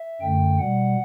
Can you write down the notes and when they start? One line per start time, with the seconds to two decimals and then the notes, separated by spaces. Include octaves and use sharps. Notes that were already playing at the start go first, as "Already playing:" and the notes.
Already playing: E5
0.21 F#2 D3 A3 G5
0.59 B2 G3 F#5